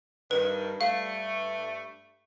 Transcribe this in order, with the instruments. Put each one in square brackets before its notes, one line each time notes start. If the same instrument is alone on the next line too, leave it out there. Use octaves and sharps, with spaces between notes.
[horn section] G2 D#3 [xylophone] B4
[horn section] G2 A3 [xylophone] F5